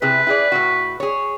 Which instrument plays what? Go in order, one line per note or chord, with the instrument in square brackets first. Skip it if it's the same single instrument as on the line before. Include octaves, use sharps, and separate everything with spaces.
[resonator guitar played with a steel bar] C3 E4 G#4 [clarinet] B4
[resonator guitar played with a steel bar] E4 G#4 D5
A2 C3 F#4
G#4 C#5